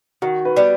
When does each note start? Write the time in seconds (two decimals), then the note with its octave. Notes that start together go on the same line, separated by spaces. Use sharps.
0.22 D#3 F#4
0.45 B4
0.57 G3 B3